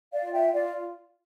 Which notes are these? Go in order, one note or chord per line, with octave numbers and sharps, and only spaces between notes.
D5 F5
F4
E5 G5
F4 D5 F5